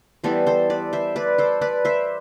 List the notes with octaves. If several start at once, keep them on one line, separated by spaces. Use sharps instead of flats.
E3 G3 B3 A4 C5
A4 C5
B4 D5
C5 E5
B4 D5
A4 C5
B4 D5
C5 E5